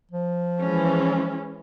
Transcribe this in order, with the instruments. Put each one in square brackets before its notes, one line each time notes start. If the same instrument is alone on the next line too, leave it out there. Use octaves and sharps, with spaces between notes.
[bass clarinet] F3
[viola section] E3 G#3 C#4